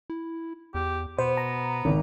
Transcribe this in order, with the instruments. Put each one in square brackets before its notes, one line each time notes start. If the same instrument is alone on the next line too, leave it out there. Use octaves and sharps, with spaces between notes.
[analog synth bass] E4
[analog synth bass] E2 [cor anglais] G4
[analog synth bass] B2 [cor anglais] B3 [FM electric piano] C5
[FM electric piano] A#5
[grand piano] G#1 [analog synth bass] C#3